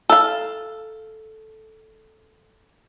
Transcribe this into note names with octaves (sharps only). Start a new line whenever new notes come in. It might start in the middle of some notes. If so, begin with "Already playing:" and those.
A4 F5